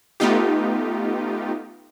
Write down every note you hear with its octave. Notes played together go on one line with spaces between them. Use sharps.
A3 B3 D#4 F4 G4